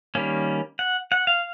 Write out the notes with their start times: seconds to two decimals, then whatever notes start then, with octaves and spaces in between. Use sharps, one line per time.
0.15 D#3 G3 A#3 C#4
0.79 F#5
1.12 F#5
1.27 F5